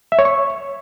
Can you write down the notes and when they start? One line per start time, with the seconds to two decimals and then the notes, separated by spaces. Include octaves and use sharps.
0.12 E5
0.19 C#5
0.25 C#6